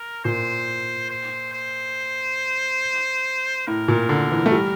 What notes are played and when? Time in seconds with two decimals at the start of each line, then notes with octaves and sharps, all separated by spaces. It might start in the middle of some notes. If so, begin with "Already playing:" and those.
Already playing: A#4
0.25 A#2 C5
1.10 C5
1.53 C5
3.67 A2 A#4
3.88 A#2
4.09 D3
4.31 E3
4.46 A3
4.52 G3